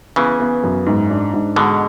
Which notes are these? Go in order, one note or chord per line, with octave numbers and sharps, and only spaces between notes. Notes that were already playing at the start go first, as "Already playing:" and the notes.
C#3 E3 B3
B3
F#2
G#2
D4
G#2
B2 D3 G#3